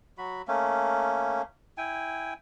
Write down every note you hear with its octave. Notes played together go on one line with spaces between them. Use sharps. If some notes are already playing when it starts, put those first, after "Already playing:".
F#3 F#4 B5
A3 A#3 C#4
E4 G5 G#5